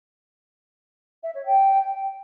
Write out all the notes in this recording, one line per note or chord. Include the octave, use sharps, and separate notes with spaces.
E5
C#5
G5